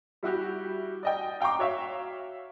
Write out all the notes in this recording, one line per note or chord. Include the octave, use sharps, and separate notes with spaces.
G3 E4 F#4 G4
D5 D#5 G5
F5 G5 A#5 C#6 D6
F#4 C#5 E5 F5